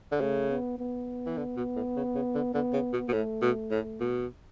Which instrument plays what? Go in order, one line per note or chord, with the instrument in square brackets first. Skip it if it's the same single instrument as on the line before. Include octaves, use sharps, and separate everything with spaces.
[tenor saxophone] D3
[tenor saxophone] C#3 [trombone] A3
[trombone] B3
B3
[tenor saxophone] E3
D3
B2
A2
C#3
C#3
D3
[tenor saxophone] D3 [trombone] B3
[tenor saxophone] C#3
B2
B2
[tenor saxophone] A2 [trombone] A3
[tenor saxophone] B2
A2
B2